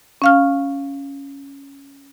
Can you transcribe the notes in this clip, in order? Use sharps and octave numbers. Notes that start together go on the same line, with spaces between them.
C#4 F5 F6